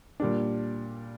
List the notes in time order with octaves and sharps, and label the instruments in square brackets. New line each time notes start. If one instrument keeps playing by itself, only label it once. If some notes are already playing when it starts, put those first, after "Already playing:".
[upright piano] A#2 G3 D4